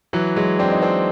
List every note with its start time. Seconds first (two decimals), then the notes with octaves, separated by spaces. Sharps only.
0.13 E3 F#3
0.36 F#3 G#3
0.59 C4 D4
0.71 D#4
0.82 C4 D4